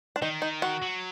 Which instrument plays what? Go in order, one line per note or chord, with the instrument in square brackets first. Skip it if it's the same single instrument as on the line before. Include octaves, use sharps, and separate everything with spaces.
[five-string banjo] D4
[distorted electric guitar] D#3 [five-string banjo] D#4
[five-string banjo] D#4
F#4
[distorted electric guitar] F#3